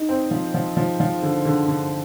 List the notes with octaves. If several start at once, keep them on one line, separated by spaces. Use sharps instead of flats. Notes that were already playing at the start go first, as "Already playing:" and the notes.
Already playing: D#4
C4
F3
F3
F3
F3
D3
D3
D3